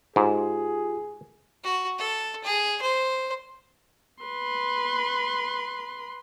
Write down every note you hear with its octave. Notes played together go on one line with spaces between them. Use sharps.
G#2 F4 G4 G#4
F#4
A4
G#4
C5
B4 C6